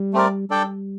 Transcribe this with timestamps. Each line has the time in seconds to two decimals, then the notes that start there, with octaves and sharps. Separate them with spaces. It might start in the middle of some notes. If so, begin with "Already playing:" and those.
Already playing: G3
0.14 A3 C4 G4 A#4 D5
0.49 G3 D4 A4 D5 G5